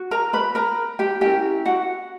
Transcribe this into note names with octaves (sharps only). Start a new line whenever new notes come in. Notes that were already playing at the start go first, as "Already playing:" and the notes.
Already playing: F#4
A#4 A#5
B4 B5
A#4 A#5
G4 G5
C#4 E4 G4 A#4 G5
F#4 F#5